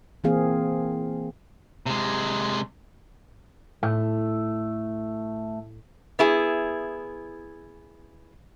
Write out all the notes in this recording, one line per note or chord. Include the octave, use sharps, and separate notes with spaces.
E3 A#3 C4 G#4 F5
C3 G#3
A2 A3
B3 E4 G#4